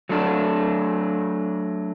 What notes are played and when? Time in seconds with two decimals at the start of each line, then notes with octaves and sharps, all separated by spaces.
0.09 F#3 A3 D4